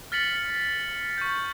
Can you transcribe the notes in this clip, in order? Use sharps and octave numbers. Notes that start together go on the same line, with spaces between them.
F6 A6 B6 C#7 F#7
C#6 G6